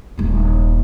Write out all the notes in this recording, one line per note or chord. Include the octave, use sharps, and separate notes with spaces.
D#1 G2